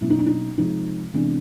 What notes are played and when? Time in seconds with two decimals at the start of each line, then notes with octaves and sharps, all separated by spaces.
0.01 B2 F#3 A#3 C#4 E4
0.10 D#4
0.19 D4
0.26 D#4
0.57 C3 F3 G#3 D#4
1.14 C3 E3 G#3 B3 D4